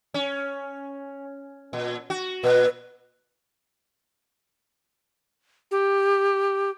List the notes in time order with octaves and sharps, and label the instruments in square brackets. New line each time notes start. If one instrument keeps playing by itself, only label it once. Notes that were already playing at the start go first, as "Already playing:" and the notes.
[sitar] C#4
A#2
F#4
[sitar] A#2 [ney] B4
[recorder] G4